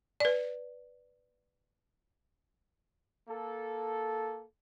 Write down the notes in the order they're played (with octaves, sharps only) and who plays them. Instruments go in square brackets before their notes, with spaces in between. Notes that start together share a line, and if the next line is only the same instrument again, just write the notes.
[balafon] B4 D5
[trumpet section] A#3 A4